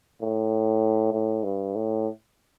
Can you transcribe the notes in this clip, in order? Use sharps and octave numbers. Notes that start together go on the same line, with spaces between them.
A2
A2
G2
A2